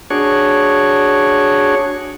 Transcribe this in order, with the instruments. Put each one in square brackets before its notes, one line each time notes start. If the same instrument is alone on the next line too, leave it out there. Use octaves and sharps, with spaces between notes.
[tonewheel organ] D4 F#4 G#4 C#5